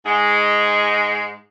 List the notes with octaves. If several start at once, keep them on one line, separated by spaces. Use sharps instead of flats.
G#2 G#3